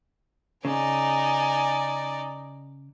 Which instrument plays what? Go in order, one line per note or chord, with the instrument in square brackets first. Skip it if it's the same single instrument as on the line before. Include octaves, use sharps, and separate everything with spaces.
[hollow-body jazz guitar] C#3 [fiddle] D#4 D5 [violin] G#5